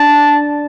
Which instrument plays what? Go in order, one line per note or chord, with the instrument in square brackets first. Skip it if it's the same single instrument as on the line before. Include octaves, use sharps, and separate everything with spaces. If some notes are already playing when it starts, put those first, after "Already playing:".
Already playing: [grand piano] D4 [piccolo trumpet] A5